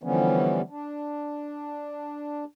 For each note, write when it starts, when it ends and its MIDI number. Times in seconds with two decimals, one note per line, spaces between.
0.03 0.61 50
0.03 0.61 52
0.03 0.61 53
0.03 0.61 55
0.03 0.61 59
0.03 0.61 61
0.70 2.44 62